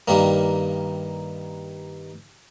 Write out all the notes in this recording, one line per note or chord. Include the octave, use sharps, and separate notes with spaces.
G2 D#3 G3 A#3